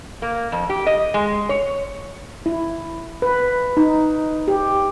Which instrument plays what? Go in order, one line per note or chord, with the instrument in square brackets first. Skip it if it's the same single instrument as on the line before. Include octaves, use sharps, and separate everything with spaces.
[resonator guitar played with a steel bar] A#3
F2
G4
D#5
G#3
C#5
[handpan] E4
B4
D#4
G4